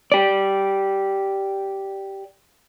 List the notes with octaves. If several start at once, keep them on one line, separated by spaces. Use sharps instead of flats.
G4 D5